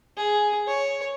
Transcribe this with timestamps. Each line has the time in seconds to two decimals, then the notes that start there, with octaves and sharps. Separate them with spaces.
0.17 G#4
0.67 C#5